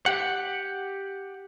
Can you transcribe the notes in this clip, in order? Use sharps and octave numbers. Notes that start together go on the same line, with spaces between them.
G4 F#5